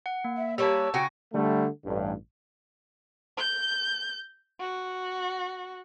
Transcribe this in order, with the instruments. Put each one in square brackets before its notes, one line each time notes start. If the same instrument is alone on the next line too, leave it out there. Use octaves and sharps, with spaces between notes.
[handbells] F#5
A#3
[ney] E5
[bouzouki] G3 A#3 B4 [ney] C#5 [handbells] A5 C#6 E6
[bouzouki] C#3 F#4 [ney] G5 [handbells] G#5 A#6
[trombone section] D3 G3 A3
A1 G2
[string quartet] G6
F#4